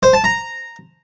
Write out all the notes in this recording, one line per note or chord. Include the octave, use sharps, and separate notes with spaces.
C5
A5
A#5